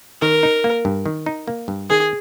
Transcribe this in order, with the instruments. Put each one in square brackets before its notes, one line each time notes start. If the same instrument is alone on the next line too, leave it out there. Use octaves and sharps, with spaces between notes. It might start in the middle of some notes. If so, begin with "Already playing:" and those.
[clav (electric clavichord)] D#3 [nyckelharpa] A#4
[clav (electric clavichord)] D#4
A#3
G2
D#3
D#4
A#3
G2
[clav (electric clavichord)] D#3 [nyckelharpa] G#4